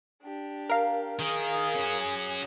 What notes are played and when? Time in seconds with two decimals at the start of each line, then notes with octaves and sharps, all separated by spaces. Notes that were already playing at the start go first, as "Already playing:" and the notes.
0.23 D4 G4
0.70 A#4 F5
1.19 D#3 G#4
1.75 C#4 F#4